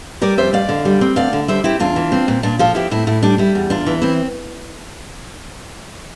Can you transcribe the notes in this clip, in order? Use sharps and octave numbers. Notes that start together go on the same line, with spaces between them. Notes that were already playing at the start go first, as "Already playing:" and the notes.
G3 A#4 D5
F2 C5 E5
F2 D5 F5
D3
G3
C4
D2 D5 F5
D3
G3 C5 E5
C4 E4 G4
E2 D4 F4
E3
C4
A#2
A#2 D4 F4
F3 F4 A4
C4 E4 G4
A2 E4
A2 E4
G3 D4
G3 E4
E2
E2 D4 F4
E3
C4 E4